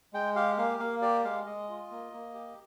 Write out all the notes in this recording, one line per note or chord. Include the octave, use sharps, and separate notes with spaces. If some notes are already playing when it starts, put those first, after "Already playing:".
G#3 G5
G4 F5
A#3 F5
A#3 F5
G4 D5
G#3 F5
G#3 D#5
F4
A#3
A#3
G4